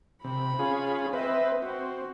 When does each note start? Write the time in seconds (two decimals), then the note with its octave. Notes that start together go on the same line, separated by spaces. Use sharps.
0.24 C3 B5
0.59 C#4 F4 G#4
1.13 C4 B4 D#5 E5
1.62 C4 F#4